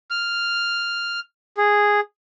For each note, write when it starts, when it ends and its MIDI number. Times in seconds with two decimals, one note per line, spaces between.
0.11 1.20 89
1.58 2.00 68